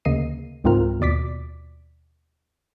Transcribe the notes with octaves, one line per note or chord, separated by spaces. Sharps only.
D2 C#3 A#3 D#5 C7 D#7
C#2 G#2 C4 F4 A#4 F6
D#2 B2 D5 D6 B6